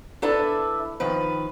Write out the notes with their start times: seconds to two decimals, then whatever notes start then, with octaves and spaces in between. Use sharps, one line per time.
0.22 D4 E4 A4 B4 E5
1.00 D#3 F3 B4